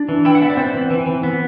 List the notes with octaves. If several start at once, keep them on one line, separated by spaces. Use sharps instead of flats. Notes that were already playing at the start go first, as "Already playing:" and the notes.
Already playing: D4 D5
E3
E4 G5
F#5
B3 E5
D5
B3 C4 C5
E3
E3
E3
B3